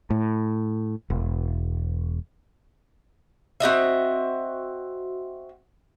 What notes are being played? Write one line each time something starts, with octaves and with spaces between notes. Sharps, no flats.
A2
E1
C4 F#4 D#5 E5